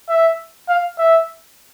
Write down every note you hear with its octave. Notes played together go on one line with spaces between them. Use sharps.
E5
F5
E5